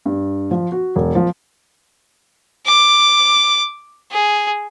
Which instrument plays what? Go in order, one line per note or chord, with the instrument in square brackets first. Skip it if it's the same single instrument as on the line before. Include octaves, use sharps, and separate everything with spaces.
[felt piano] G2
F3
F#4
E1
F3
[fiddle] D6
G#4